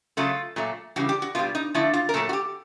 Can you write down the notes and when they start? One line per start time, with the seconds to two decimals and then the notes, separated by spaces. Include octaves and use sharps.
0.17 C#3 F#3 A3 F4
0.56 A#2 F#3 A3
0.96 C#3 E3 G3 F#4
1.09 G4
1.22 F#4
1.35 B2 G3 F4
1.55 D#4
1.74 D3 F3 A3 E4
1.94 F4
2.09 A#4
2.14 A#2 F#3 A3 A4
2.29 F#4
2.33 G4